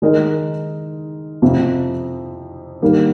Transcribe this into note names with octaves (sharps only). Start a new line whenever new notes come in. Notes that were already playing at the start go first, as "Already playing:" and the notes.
D#3 G#3 D#4 A#4 D#5
F2 C3 F3
G2 D#3 G3 A#3